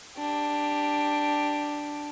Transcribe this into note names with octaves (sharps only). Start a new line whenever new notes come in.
D4 G4